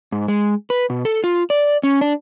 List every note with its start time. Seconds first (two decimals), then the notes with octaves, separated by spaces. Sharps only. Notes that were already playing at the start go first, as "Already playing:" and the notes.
0.12 G#2
0.28 G#3
0.70 B4
0.90 B2
1.05 A4
1.24 F4
1.50 D5
1.83 C#4
2.01 D4